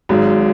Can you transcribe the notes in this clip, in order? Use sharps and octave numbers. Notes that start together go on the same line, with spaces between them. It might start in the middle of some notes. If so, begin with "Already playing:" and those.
G#1 G#2 F#3